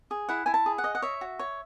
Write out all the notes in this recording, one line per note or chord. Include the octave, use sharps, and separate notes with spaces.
G#4
E4 F#5
E4 G#5
A5
G#4
F#5
D#5
F#5
C#5 E5
F#4
C#5